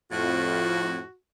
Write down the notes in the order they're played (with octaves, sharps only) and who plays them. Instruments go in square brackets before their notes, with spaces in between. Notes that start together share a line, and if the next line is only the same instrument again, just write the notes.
[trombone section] F2 [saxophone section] A2 F4 [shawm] F#4